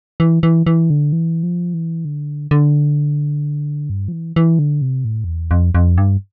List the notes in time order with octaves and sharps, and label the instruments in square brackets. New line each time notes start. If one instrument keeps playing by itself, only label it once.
[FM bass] E3
E3
E3
D3
E3
F3
E3
D3
D3
G2
F3
E3
E3
D3
C3
A2
F2
E2
F2
F2
G2